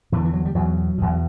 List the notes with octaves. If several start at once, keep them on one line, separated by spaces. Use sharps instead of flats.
E2 D3 E3
E3
F#3
G3
E2 B2 F#3
E2 B2